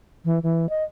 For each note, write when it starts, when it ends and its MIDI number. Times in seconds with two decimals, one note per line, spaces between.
0.25 0.39 52
0.43 0.69 52
0.69 0.83 75